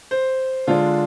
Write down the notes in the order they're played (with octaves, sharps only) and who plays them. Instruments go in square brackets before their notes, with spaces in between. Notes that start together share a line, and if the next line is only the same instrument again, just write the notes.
[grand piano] C5
D3 G#3 D4 F4